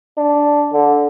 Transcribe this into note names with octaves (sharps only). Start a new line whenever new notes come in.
D4
D3